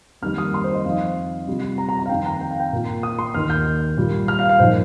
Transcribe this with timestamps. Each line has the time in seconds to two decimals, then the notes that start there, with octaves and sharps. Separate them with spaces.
0.22 F2 D#3 G3 A#3 F6
0.38 D#6
0.54 C6
0.64 C5
0.74 D#5
0.85 F2 F3 D#4 F5
1.47 C3 G3 C4 F4
1.78 A#5
1.89 A#5
1.99 A#5
2.06 F5
2.09 F2 D#3 C4 G5
2.26 A#5
2.41 G5
2.51 F5
2.60 G5
2.72 A#2 A#3 F4
3.03 D#6
3.19 C6
3.34 D#2 D#3 A#3 F6
3.50 G6
3.97 A#2 G3 A#3 F4
4.28 F6
4.39 F5
4.49 F5
4.59 A#2 F3 D#4 C5